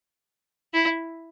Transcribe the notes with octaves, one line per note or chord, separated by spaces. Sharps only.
E4